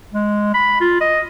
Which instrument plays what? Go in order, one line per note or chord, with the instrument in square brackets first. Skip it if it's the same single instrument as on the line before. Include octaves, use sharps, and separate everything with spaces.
[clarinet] G#3
B5
F4
D#5